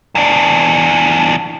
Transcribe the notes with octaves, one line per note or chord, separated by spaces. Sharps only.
E2 D4